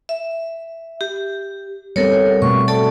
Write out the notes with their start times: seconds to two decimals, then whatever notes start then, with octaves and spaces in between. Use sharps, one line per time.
0.09 E5
1.01 G4
1.96 G3 B3 C4 A4 A#4 C#5
2.42 B2 A3 C4 C#6
2.68 A4 D5 A5